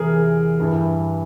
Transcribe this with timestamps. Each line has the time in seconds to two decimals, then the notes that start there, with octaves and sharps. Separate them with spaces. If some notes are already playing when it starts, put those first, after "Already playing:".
Already playing: E2 C3 E3 G#4 A#4
0.60 G2 E3